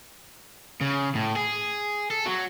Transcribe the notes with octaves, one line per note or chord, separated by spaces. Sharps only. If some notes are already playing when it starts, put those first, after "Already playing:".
C#3
A2
G#4
A4
F#3